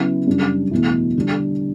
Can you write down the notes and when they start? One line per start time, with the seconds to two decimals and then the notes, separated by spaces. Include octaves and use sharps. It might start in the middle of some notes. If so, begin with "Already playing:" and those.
Already playing: C#3 F#3 B3 E4
0.27 F#2 C#3 G3 D4
0.71 E2 B2 A3 E4
1.15 D3 G3 D4